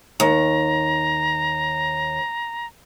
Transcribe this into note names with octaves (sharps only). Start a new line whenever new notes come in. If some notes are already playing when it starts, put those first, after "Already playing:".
D#2 A#5